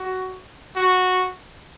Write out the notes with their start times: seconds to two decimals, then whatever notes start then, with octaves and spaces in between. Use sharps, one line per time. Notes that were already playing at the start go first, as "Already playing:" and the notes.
Already playing: F#4
0.76 F#4